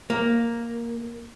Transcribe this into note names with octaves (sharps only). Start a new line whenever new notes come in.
A#3